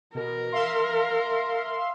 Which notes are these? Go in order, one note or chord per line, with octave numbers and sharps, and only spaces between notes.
B2 A#4
E5 F5 C6